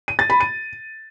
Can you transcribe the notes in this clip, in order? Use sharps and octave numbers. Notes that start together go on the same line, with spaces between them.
D#7
A6
B5
D#7